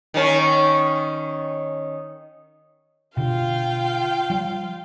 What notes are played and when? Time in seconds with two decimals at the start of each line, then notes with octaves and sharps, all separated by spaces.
0.14 D#3 C#4
3.17 B2 D3 F4 F5 G5
4.30 F3 G3